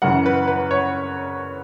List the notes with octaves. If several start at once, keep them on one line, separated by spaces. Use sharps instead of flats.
F#2 C#3 E3 F#5
B4
B4
C#5